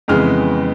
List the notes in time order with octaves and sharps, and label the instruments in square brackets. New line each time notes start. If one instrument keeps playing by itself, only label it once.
[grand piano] F2 C#3 E3 G#3 B3 F6